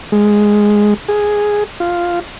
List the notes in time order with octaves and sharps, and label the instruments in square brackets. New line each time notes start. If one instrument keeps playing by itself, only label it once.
[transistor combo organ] G#3
G#4
F4